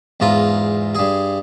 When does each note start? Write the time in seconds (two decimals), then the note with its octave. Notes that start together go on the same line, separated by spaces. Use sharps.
0.20 E2 G#2 F4 A#5
0.95 G2 G#4